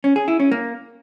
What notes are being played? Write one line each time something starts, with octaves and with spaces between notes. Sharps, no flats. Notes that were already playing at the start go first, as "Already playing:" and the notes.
C#4
G#4
E4
C#4
A#3